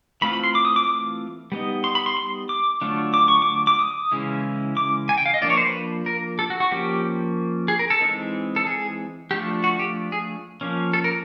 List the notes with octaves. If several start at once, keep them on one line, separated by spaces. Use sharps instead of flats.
E3 A3 C4 F4 B5
B5
C6
D6
D#6
D6
D6
G3 B3 D#4
C6
B5
C6
C6
D6
D3 F#3 A3 D4 F4
D6
C#6
D6
D6
D#6
C#3 E3 G#3 C#4 E4
D6
G#5
G5
F5
D#5
F3 A#3 D4 F4 D5
C#5
C5
B4
A#4
A4
F#4
F#4
F3 A#3 C#4 G4
G#4
A#4
A4
E3 G#3 C4 D#4
A4
G#4
F3 A3 D4 F4 G4
F#4
G4
G#4
F3 A#3 C#4
A4
A#4